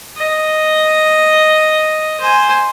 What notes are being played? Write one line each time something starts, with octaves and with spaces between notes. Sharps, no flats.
D#5
C5 G#5